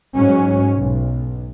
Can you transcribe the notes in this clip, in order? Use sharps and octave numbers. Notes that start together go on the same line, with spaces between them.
G#2 F#3 C#4
B1